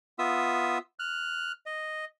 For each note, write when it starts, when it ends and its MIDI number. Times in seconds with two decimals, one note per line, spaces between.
0.19 0.78 59
0.19 0.78 65
0.19 0.78 76
0.19 0.78 87
0.19 0.78 88
0.99 1.52 89
0.99 1.52 90
1.66 2.05 75